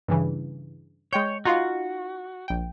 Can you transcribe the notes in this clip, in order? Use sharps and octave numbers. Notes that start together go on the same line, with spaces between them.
G2 C#3 E3
G#3 C#5 G5 G6
D#4 F4 F#4 F5
A#1 G5